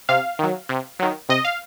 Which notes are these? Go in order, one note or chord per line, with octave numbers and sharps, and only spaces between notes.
C3 F5
D#3 F#3
C3
D#3 F#3
C3 D#5
F5